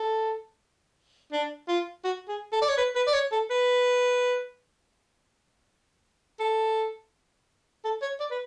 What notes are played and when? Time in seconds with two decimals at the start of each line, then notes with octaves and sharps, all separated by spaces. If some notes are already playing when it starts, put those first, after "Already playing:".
Already playing: A4
1.33 D4
1.68 F4
2.04 F#4
2.28 G#4
2.52 A4
2.61 D5
2.69 C#5
2.78 B4
2.95 B4
3.07 D5
3.14 C#5
3.32 A4
3.50 B4
6.40 A4
7.84 A4
8.02 C#5
8.20 D5
8.31 B4